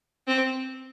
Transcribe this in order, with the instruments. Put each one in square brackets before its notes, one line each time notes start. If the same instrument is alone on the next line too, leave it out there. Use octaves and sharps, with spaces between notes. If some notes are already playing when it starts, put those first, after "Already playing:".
[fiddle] C4